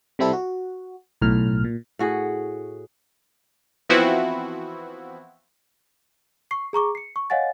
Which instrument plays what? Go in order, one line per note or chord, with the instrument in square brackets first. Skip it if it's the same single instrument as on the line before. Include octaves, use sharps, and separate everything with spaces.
[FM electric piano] C3 G3 C4 E4 A4
F#4
B1 A2 F6
A#2
[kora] A2 F#4 G#4
[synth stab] E3 F3 B3 C4 E4 F#4
[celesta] C#6 C7
G#4 A#5 C#6 D6
C7 C#7
C#6
C#5 D#5 F5 F#5 G#5 A6